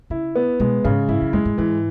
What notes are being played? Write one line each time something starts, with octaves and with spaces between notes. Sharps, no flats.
C#3 E4
B3
B2 G#3
G#2 C#3
G#2 E4
F#2
F#2 G#3
G#2
G#2 E3